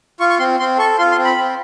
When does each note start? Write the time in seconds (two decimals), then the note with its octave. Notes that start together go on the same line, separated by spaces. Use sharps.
0.20 F4 C#6
0.30 C#6
0.39 C4 C6
0.59 C4 C6
0.78 A4 C#6
0.98 F4 C6
1.12 C6
1.18 C4
1.25 B5
1.37 C4